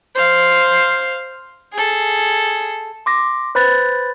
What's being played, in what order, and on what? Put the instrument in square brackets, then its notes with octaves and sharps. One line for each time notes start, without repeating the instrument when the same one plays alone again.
[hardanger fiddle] C5 F5
G#4 A4
[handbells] C6 D6 A#6
B4 C5 B5 F#6 A6